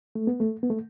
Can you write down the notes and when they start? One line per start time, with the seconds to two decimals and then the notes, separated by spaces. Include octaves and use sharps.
0.15 A3
0.27 B3
0.40 A3
0.63 B3
0.70 A3